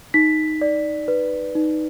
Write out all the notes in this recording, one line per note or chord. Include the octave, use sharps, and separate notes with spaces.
D#4 B6
D5
B4
D#4